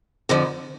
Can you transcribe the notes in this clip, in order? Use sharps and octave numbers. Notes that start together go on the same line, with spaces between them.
F2 D3 F3